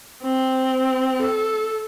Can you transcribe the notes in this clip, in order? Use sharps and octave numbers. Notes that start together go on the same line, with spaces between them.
C4
A4